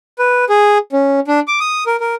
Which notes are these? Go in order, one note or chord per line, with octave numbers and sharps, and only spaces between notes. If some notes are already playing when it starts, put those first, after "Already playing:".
B4
G#4
C#4
D4
D6
D#6
A#4
A#4